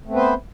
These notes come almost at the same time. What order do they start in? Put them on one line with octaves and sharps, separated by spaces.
A3 C4 B3 B4 C5